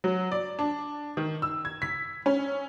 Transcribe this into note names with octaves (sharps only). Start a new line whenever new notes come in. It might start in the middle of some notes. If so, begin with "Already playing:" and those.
F#3
D5
D4
D#3
E6
G#6
B6
C#4